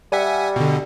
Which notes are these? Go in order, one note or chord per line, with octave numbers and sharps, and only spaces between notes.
G3 E5 F#5 G#5
B2 D3